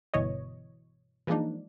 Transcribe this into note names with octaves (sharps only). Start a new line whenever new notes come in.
G1 B2 E3 C#5 D#5
E3 F3 G#3 A#3 D4 D#4